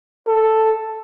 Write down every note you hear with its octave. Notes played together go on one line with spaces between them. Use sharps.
A4